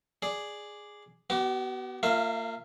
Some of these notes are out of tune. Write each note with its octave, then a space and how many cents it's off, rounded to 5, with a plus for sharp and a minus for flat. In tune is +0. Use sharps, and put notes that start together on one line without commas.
G#4 +0 D5 +0
B3 +0 F#4 +45 D6 +0
A#3 -35 F4 -5 E5 +0